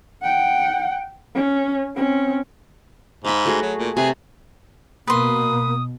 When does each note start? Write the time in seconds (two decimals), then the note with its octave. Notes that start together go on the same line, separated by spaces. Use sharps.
0.22 F#5 G5
1.35 C#4
1.96 C4 C#4
3.25 G#2 F5 B5
3.46 A3 F#4 G#4
3.63 F#3
3.79 A#2
3.97 C3 G#4 B4
5.07 B2 A#3 B4 C6 D#6